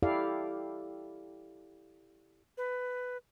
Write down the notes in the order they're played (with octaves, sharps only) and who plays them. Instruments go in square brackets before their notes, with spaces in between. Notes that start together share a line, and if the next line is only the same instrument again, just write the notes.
[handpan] E4 G4 A4 D5 F5
[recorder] B4